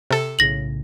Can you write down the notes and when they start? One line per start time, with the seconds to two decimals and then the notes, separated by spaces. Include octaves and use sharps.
0.11 C3 A4
0.39 B1 A2 C#3 A#6 F#7